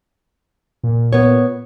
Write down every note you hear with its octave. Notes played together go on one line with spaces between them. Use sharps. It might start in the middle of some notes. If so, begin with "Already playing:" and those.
A#2
B3 C#5